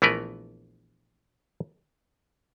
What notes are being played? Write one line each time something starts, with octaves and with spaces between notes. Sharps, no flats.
A#1 E3 A3 B3 A#4 B4